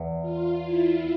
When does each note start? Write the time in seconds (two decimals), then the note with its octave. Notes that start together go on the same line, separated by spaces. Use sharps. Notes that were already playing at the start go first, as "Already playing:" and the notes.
Already playing: E2
0.21 F4
0.63 E4